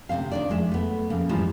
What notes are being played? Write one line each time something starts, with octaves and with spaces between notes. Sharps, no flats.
D2 C3 E3 C4 F5
D#3 D4 D5
F2 G#3 E5
A3 B3
F2 C#3 A#3
F2 G#2 E3 F3 G3 G#3